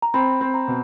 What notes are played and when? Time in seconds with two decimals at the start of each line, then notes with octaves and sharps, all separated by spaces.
0.02 A#5
0.14 C4 B5
0.41 C4
0.54 A#5
0.68 B2